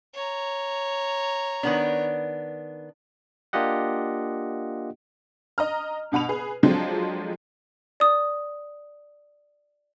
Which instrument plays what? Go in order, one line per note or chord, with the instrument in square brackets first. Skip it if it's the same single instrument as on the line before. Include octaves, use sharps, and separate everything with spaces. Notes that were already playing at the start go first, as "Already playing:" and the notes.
[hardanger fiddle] C#5 A#5
[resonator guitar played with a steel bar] D#3 B3 D4
[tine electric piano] A#3 D4 F4 G4 D#5 F#5
[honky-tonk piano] D#5 A#5 F6
G2 B2 F#5 B5 F7
G#4 B4
F3 F#3 G#3 C4 D4 A4
[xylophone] D5 D#6